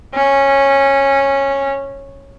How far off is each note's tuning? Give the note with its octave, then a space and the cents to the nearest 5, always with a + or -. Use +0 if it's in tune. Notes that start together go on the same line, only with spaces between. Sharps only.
C#4 -10